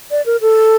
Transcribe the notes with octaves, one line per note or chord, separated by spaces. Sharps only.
D5
A#4
A4